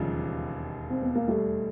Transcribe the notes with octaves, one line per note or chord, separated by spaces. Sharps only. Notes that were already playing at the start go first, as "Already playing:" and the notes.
Already playing: E1 D#2 C#3 F3 G3
C4
B3
A#3
G3 A3